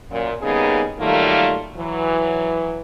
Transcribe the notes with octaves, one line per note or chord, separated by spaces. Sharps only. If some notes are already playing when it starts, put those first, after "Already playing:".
F#2 A#2
C#3 G3 A#3 B3 D#4 G#4
D#3 F#3 G3 A3 A#3 F4
E3 F#3